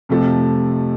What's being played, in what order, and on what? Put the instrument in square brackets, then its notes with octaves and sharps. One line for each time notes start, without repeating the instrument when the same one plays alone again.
[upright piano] F2 C3 F3 A3